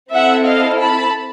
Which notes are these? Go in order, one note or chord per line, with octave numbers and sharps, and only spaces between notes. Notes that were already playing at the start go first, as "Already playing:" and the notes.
C4 E4 A4 E5 F#5
D#5 F5
A5 B5